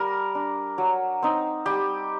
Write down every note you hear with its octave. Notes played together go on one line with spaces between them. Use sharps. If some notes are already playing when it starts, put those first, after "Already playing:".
Already playing: G3 A#4
D4
F#3
C4 D#4
G3 G4